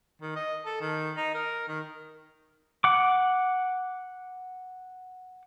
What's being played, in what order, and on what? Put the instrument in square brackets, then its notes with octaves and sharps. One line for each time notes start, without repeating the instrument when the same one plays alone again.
[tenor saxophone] D#3
D#5
A4
D#3
D#4
A#4
D#3
[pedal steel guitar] F#5 D6